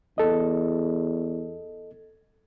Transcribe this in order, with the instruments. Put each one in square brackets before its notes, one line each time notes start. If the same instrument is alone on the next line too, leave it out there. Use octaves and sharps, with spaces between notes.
[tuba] E2 [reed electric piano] A4 D#5